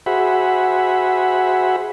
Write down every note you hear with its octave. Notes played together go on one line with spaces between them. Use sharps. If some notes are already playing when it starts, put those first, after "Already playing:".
F#4 G#4 C5 E5 F#5 B5